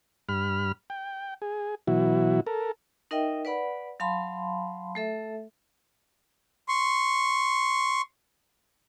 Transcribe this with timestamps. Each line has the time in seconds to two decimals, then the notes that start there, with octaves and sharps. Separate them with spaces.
0.29 G2 B5 F6
0.90 G5
1.42 G#4
1.87 B2 E3 F#3 E4 F#4
2.47 A4 A#4
3.11 D#4 A#4 D#5 E5 G5
3.45 B4 D5 F#5 B5
4.00 F#3 F5 A5 B5 C6
4.95 A3 A4 E5
6.68 C6 C#6